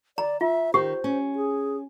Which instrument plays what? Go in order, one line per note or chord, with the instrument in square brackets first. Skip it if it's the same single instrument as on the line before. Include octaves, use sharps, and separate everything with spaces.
[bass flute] D5 [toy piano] A#5
[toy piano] F4 [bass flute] E5
[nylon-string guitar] D#3 [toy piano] G4 [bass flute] C5
[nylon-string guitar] C#4
[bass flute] G#4